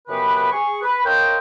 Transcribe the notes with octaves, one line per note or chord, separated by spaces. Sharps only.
F#2 C#3 B3 G4 B4
G#4 C#6
B4
A#4 C5 C#5 D#5 F5 G5